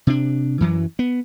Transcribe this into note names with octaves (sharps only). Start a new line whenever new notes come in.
C3 D4
F#2 E3 F#3
B3